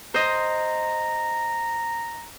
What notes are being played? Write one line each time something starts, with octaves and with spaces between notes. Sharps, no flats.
C5 D#5 A#5